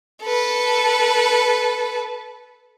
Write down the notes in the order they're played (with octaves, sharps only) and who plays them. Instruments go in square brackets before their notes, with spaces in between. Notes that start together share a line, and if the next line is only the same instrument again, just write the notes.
[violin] A4 B4